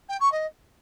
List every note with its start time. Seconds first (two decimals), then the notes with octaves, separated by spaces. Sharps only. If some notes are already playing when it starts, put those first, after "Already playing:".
0.09 G5
0.20 C#6
0.32 D#5